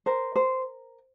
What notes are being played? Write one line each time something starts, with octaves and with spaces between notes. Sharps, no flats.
A#4 C5
C5